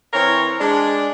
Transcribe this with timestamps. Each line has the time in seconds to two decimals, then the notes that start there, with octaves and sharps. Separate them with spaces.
0.13 E3 C4 A#4 C#5
0.60 G#3 D4